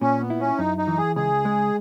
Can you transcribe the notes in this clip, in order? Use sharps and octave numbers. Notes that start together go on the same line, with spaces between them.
A#2 C#4
B3
E4
C#4
F#2 D#4
D#4
E3
G#4
C#2 G#4
G#3